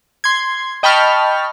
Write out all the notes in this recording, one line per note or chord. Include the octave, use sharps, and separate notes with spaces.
C6 G#6
D#5 G5 A5 B5 C#6 F6